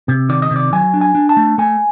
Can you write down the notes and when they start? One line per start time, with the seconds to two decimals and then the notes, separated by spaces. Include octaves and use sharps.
0.08 C3
0.29 D#3 D5
0.42 D#5
0.51 C3
0.56 D5
0.73 F#3 G#5
0.94 D4
1.01 G#5
1.15 D4
1.29 A5
1.37 A3
1.58 A3 G#5